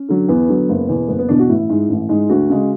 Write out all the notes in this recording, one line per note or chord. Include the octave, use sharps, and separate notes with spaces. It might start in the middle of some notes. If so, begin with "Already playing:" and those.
Already playing: C#4
D3 F#3
E2 B3
D3 F#3
F#1
E2 B2
F#1 B3
B3
E2 B2 D4
F#4
A1 E4
G#2 G#3
A1
G#2 G#3
D2 F#4
C#3 G#3